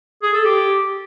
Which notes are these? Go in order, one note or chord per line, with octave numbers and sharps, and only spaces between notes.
G#4
A4
G4